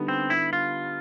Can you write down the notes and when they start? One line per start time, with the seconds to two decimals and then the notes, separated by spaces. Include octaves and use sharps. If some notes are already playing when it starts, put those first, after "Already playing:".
Already playing: D3 G3 B3 D#4
0.08 C4
0.30 E4
0.53 F4